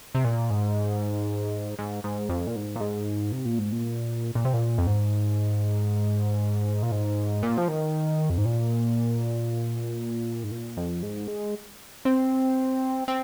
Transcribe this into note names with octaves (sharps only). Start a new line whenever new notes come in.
C3
A#2
G#2
G#2
G#2
F2
A#2
G#2
A#2
G#2
C3
A#2
G#2
A#2
A#2
C3
A#2
F2
G#2
A#2
G#2
A#2
F3
D#3
F2
G#2
A#2
G#2
A#2
F2
G#2
G#3
C4
C4